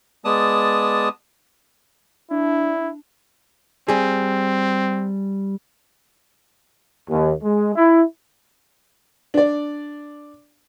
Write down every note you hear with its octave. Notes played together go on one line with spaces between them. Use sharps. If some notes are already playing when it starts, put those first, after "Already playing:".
G#3 B3 D5 A5 D#6
D4 E4
G3 C4 G#4
D#2
G#3
E4
D4 D5